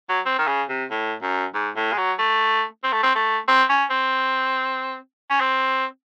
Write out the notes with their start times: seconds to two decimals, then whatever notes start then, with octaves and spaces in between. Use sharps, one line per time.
0.09 F#3
0.26 C4
0.39 D#3
0.47 C#3
0.69 C3
0.91 A2
1.22 F#2
1.54 G#2
1.76 A2
1.92 G#3
1.97 F#3
2.19 A3
2.83 C4
2.92 A3
3.03 C4
3.15 A3
3.48 C4
3.69 C#4
3.90 C4
5.30 C#4
5.40 C4